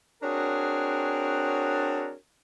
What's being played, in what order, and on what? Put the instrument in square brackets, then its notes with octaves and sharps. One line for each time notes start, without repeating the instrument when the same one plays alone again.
[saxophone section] C4 D4 F#4 G#4 A#4 C#5